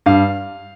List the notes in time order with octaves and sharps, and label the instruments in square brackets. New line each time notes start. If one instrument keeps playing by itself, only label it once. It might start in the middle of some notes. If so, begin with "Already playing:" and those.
[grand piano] G2 F5